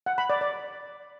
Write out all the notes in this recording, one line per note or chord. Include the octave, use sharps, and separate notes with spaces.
F#5
B5
D5
D5